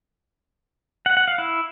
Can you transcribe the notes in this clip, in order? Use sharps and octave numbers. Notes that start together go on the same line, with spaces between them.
F#5
F#5
F5
E4